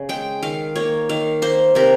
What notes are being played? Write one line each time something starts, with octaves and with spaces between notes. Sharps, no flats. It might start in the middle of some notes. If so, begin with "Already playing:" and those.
Already playing: C#3
G#3 G5
D#3 F5
A#3 C#5
D#3 F5
A#3 C5
C3 A#4